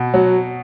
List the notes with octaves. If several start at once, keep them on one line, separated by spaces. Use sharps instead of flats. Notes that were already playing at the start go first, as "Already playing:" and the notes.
Already playing: B2
F#3